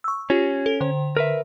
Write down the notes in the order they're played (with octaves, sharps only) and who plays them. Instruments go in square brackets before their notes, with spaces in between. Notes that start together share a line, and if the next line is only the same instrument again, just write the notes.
[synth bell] C#6 E6
[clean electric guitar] C#4 [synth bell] F4 G4
[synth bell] A4
D3 C5
[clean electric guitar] A#4 B4 E5